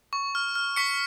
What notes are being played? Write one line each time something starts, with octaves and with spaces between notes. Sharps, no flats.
C#6
F6
F6
C#6 B6 C#7